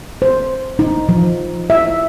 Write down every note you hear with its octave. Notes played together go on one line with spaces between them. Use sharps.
C5
D#4
F3
E5